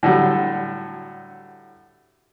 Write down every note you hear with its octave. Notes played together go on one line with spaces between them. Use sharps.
A2 D3 F#3 G3